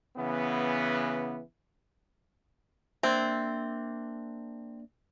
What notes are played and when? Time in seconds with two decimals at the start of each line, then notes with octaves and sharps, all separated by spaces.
0.16 C#3 E3 B3
3.03 A#3 C4 D4 E5